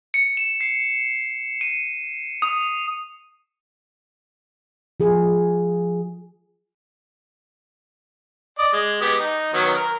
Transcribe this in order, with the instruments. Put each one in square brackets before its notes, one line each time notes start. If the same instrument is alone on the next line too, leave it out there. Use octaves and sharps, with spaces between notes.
[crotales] C#7
E7
C7
D#7
D#6
[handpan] F3 G#4
[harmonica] D5 D#5
G#3
G#3 B3 G4
D#4
D#3 F#3 B3
A#4